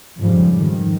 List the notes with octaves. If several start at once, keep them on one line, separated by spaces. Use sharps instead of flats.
F2 G#2 C#3 F3 G3
D#3